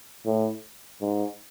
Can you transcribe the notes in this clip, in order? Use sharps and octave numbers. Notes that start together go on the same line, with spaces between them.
A2
G#2